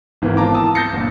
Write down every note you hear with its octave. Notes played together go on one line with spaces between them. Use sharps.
G#1 E3 B3 C4 E4 A#4
F4 A5 A#5 D6
A5 D#6 E6
G6 A6 A#6 C7 C#7
G1 A#2